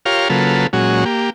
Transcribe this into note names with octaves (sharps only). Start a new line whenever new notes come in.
F4 G4 A#4 C#5 F5
C#3 F#3 A#3 F4 A4 B4
A#2 F#3 G#3 C#4 F#4
A#3 G4